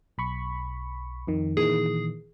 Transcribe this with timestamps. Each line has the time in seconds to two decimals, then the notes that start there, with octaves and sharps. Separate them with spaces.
0.18 B1 B5 C#6
1.27 F2 D#3
1.57 A#2 D#3 E3 G#4